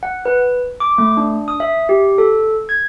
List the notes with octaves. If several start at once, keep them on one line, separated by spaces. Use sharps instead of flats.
F#5
B4
D6
A3
D4
D#6
E5
G4
A4
G#6